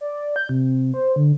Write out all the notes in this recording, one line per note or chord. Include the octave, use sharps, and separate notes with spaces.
D5
G6
C3
C5
D3